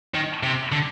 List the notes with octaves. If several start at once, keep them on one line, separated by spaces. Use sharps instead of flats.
D#3
C3
D3